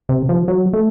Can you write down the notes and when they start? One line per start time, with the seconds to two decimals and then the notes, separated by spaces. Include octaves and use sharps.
0.09 C3
0.29 F3
0.48 F#3
0.73 A3